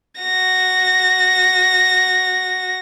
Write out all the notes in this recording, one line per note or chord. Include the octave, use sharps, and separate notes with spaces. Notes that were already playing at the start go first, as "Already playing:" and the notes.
F#4 A#6